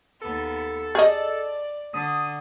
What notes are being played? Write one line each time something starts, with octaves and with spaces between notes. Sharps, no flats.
D#2 B3 A4
G#4 D5 D#5
D3 D#6